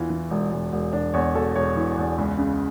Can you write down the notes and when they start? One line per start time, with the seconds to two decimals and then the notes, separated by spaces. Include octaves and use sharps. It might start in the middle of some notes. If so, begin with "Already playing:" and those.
Already playing: E2 E3 F4
0.10 E3
0.31 E1
0.52 E1
0.72 E1
0.93 E1 D4
1.14 E2 C#5
1.35 E1 A4
1.55 E1 C#5
1.76 E3
1.98 E2
2.18 C#2
2.38 C#3